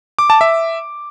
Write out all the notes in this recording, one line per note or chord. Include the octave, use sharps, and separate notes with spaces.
D6
A5
E5